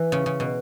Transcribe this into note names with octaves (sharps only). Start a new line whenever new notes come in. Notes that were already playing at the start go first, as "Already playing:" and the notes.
Already playing: E3
C#3
C#3
B2